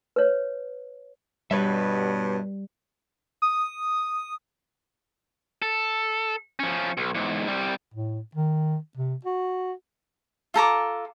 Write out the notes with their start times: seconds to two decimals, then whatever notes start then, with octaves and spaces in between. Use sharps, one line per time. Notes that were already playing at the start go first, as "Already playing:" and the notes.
0.16 B4 C#5
1.51 G2 B2 G3 B4 C#5 E5
3.42 D#6
5.62 A4
6.59 F3 C#4
6.97 B1
7.14 E2 G#2
7.48 C2 G3
7.94 A2
8.35 D#3
8.97 C3
9.25 F#4
10.54 F4 A4 A#5 D6